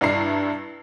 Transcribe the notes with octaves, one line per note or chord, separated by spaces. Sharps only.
G2 D4 E4 A#5 C7